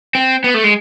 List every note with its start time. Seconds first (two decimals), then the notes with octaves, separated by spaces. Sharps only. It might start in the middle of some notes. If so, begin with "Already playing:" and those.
0.15 C4
0.44 B3
0.54 A3
0.64 G#3